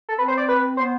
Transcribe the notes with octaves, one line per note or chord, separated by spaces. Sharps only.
A4
C4 B4
C5
D5
B4
B3 C5